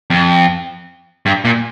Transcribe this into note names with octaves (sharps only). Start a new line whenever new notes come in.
F2
G2
A#2